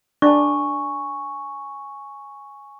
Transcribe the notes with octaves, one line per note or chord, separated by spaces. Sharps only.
D4 G#5 C#6